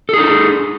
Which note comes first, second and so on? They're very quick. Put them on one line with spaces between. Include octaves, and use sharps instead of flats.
A4 G#4 D#4